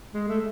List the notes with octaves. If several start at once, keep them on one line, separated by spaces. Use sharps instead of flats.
G#3
A3